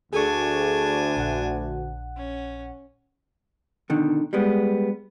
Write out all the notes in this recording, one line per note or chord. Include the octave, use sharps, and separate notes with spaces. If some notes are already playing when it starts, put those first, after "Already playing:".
D2 D4 G#4 A4 G#5 C#6
A#1 F#5
C#4
B2 D3 D#3
G3 G#3 B3